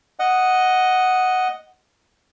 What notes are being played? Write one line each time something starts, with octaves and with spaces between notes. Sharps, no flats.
D#5 F#5